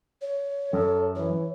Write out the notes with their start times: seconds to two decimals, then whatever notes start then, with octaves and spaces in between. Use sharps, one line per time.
0.22 C#5
0.73 F#2 A4
1.16 E3 C#5